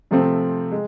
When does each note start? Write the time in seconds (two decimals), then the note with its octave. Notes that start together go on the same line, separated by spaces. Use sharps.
0.11 C3 F3 A3 C4
0.72 G#3